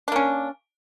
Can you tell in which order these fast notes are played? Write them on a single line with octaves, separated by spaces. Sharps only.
D4 A#3 C#4